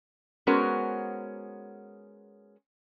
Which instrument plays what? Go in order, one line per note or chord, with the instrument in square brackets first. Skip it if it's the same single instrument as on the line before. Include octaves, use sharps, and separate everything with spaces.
[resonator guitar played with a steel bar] G#3 B3 C#4 F#4 A#4 C5